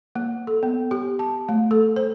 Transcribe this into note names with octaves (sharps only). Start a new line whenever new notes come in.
A#3
A4
B3
G4
A5
A3
A4
C5